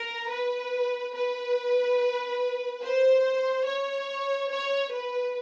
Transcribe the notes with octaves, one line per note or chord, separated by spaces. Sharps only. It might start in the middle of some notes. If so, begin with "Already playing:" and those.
Already playing: A#4
B4
B4
C5
C#5
C#5
B4